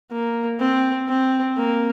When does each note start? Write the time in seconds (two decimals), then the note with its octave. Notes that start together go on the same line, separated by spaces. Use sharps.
0.11 A#3
0.60 C4
1.08 C4
1.57 A#3